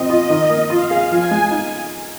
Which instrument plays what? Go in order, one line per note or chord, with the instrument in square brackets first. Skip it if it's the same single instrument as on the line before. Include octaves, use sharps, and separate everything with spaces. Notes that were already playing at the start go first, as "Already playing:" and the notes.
Already playing: [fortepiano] A#2 C4 [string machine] D#5
[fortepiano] F4
D#3
A#3
[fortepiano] F4 [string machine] F5
[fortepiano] G#4
[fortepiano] F3 [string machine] G#5
[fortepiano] G#3
D#4